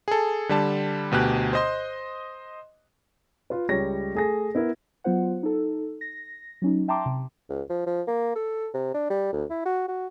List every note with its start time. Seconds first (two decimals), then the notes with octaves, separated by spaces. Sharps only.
0.08 G#4 A4
0.49 D3 G3 A5
1.11 D2 B2 G4 F#6
1.53 C5 D#5 C6
3.50 F4 B4
3.69 C#2 G3 C#5 A#6
4.15 A3 G#4 A#6
4.55 B3 E4 A#4
5.04 F#3 B3 F4 C5 F#5
5.43 D#4 A4
6.01 A#6
6.62 F#3 C#4 D#4
6.88 E5 G5 A5 A#5 C6 D6
7.06 C3
7.50 C#2
7.70 F3
7.87 F3
8.08 A#3
8.36 A4
8.74 C3
8.94 D4
9.10 G3
9.33 D2
9.50 E4
9.66 F#4
9.88 F#4